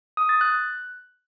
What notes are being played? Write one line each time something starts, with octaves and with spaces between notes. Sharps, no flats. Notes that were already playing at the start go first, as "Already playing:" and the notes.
D#6
A6
F#6